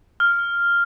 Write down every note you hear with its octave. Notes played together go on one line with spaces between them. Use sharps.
F6